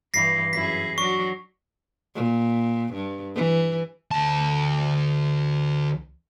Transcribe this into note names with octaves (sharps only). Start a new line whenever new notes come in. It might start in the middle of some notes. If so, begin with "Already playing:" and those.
G2 E3 A#6 C7
F#2 E4 G#4 B6
F#3 D4 F#4 C#6
A#2
G2
E3
D2 A5